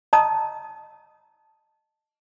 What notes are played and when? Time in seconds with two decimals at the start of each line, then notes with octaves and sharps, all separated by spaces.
0.13 D#5 A5 A#5 D#6